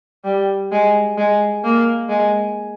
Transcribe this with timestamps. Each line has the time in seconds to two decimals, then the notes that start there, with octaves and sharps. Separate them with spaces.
0.25 G3
0.72 G#3
1.18 G#3
1.64 A#3
2.09 G#3